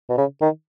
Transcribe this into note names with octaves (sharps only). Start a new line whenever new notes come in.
B2
C#3
D#3